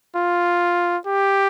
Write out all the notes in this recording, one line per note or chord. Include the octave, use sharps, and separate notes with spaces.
F4
G4